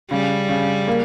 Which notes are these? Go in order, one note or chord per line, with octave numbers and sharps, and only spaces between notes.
C#3 G3
C#3
A#3